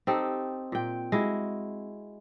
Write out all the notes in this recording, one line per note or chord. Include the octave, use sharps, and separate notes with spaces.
C4 D#4 G4 A4
A#2 G5
G#3 E4 F#4